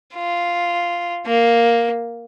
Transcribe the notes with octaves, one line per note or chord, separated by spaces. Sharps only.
F4
A#3